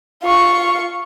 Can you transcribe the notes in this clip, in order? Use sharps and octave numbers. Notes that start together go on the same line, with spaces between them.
F4 C#6